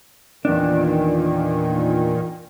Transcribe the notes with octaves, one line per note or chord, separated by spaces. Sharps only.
E2 A#2 D#3 D4